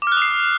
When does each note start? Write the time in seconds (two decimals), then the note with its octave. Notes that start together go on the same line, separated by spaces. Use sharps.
0.02 D6
0.07 F6
0.12 F#6
0.17 D#6
0.22 C7